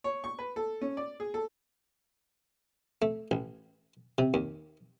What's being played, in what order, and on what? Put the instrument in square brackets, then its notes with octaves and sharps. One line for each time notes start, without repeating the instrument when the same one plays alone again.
[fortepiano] C#5
C#6
B4
A4
C#4
D5
G#4
A4
[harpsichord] A3
A1
C3
D#2